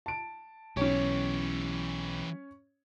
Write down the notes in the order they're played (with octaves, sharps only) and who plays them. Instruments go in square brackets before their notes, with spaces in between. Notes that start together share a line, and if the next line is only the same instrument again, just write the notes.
[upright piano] A5 D7
[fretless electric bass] B1 [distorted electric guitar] E3 G4 [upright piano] C#4 C#5